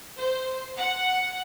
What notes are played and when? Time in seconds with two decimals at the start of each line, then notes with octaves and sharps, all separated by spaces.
0.18 C5
0.79 F#5